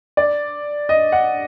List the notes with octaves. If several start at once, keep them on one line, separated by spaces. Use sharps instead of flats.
D5
D#5
F#5